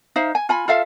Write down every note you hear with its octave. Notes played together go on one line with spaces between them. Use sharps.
D#4 C5 E5 F5
G#5
F4 G#5 B5
F4 A4 E5 F5